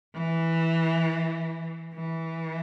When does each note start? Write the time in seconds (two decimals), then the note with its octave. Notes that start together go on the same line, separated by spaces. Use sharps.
0.15 E3
1.95 E3